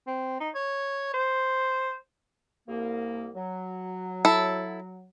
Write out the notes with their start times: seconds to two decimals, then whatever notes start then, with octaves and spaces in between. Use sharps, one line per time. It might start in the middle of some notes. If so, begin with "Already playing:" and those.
0.07 C4
0.41 D#4
0.55 C#5
1.14 C5
2.67 C2 A#3
3.35 F#3
4.25 E4 A4